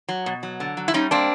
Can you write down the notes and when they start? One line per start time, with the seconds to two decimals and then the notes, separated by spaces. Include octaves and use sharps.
0.09 F#3
0.26 B2
0.43 F#3
0.60 D3
0.77 F#3
0.88 E4
0.94 G3 C#4 D#4
1.11 A#3 C4 D4